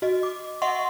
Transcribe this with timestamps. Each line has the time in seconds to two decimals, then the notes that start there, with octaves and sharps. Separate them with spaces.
0.02 F#4 D#5
0.23 D6
0.62 D#5 E5 F#5 C6 C#6